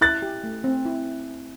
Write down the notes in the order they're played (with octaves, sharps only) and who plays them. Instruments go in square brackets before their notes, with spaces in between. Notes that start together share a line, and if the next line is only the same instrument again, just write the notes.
[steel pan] E4 [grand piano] F#6 A6
[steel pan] G4
A3
C4
E4